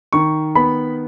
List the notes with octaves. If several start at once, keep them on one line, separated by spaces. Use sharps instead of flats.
D#3 C#6
B3 B5